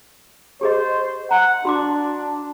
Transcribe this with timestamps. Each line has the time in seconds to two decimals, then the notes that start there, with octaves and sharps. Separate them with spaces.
0.61 G4 G#4 C5 D#5
1.31 F#5 A#5
1.65 D4 F#4 C6 D6